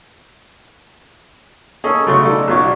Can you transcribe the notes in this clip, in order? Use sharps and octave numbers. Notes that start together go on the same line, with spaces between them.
A#3 C#4 G#4 A4 D#5
B1 C#3 F#3 A3 C6 C#6
D#4 A4 D5
B1 B2 F4 C#5 D5 C#6